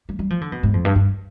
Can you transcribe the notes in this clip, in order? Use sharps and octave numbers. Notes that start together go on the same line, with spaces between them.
G3
G3
F3
D3
B2
G#2
F2
G2
G2